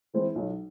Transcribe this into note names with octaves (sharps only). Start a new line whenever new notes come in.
E3 G#3 C4 E4
B1